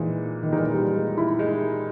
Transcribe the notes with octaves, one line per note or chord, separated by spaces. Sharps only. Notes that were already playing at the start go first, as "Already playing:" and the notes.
Already playing: A#2 E3 G#3 D#4
D#3
A#2 E3 G#3 D#4 A#4
G3
G#3
E4
G#3 D#4